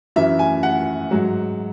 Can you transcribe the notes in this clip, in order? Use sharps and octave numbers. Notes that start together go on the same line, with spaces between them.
F#2 E3 E5
G#5
F#5
G#2 F#3